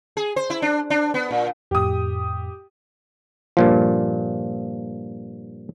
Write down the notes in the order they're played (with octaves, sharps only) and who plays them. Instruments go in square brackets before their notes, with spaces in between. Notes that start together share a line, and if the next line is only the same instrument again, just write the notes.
[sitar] G#4
C5
E4
D4
D4
B3
A#2
[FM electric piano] F2 A2 [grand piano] G4 D#6
[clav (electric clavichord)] G2 A#2 F3